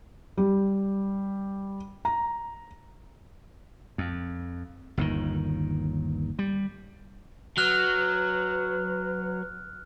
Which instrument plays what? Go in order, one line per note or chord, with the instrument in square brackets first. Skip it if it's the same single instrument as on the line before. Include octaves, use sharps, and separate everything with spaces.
[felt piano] G3
A#5
[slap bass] F2
G1 D#2 D#3
G3
[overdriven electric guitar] F#3 [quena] B4 [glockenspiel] F6 F#6